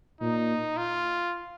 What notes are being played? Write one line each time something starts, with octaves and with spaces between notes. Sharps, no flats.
A#2 D#4
F4